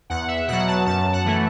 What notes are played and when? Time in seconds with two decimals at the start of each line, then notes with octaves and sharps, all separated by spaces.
0.10 E2 F#5
0.28 E5
0.48 B2 F#3 F#5
0.68 A5
0.86 F#2 A5
1.13 F#5
1.25 E3 A3